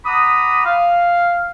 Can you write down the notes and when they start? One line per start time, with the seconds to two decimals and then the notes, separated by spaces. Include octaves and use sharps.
0.05 F#5 A#5 B5 D6 D#6
0.66 F5